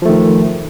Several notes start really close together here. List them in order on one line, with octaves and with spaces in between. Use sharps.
F3 A3 D#3